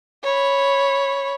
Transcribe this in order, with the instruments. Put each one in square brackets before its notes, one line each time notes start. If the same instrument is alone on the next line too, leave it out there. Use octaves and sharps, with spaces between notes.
[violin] C#5 B5